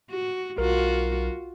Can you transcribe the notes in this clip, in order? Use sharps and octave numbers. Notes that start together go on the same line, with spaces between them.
F#4
B1 F4 F#4 A#4